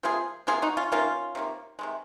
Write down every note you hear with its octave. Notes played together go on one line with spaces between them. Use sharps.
C3 F3 A#3 F4 G#4
C3 F3 A#3 F4 G#4
D#4 F#4
C#4 F4
C3 D#3 A#3 C#4 F4
C3 D#3 A#3
C3 D#3 G#3